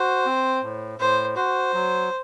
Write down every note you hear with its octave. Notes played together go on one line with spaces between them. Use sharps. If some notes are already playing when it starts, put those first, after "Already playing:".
Already playing: F#4 C5
C4
A2
A2 C5
F#4 C5
F#3